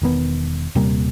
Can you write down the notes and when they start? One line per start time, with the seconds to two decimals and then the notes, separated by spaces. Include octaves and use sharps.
0.02 E1 D#3 B3
0.75 D#1 C3 G3 A#3